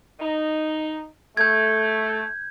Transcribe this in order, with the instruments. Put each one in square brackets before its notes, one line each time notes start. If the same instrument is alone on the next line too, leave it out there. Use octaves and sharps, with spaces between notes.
[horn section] D#4
[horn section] A3 [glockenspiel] G6 G#6